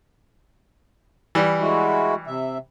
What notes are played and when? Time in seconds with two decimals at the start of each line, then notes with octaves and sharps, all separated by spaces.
1.35 E3 G3
1.61 G#3 E4 F#4
2.27 C3 E5